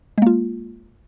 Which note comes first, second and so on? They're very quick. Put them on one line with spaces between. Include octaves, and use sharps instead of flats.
G#3 A#3 F4